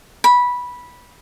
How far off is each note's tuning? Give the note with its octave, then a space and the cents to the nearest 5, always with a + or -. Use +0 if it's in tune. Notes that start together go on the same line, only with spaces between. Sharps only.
B5 -10